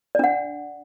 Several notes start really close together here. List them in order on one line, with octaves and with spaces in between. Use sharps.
D5 D4 F#5